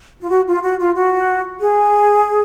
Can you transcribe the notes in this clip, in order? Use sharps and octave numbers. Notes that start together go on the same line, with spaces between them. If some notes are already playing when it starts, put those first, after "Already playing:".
F4
F#4
F4
F#4
F4
F#4
G#4